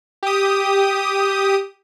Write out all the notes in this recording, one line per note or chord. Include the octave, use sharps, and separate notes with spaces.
G4 D#6